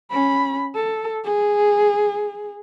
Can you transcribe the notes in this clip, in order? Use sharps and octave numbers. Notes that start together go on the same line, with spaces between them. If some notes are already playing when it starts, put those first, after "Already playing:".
C#4 B5
A4
G#4